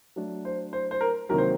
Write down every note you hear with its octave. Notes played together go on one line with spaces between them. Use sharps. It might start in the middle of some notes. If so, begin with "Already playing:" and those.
F#3 A3 D4
C5
C5
C5
A#4
C3 D#3 F#3 A#3 A#4
C5